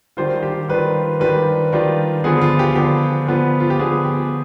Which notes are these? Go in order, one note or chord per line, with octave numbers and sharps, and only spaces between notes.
D#3 G3 D4 F4 C5
G4
D#3 G3 D4 F4 B4
D#3 G3 D4 F4 B4
D#3 G3 D4 F4
D3 F3 B3 F4 G#4
F4
G4
D3 F3 B3 F4 G4
D3 F3 B3 F4
F4
G4
D3 F3 B3 F4 G#4
G4